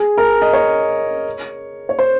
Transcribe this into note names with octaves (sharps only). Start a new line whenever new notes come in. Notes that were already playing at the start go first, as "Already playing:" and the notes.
Already playing: G#4
A#4
D#5
C#5
C#5
C5